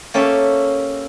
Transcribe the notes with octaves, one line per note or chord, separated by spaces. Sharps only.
A#3 C#4 G4 A4 E5